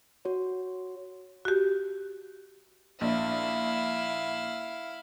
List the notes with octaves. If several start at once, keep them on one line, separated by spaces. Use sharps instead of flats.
F#4 C#5
F#4 G4
A#1 E4 F5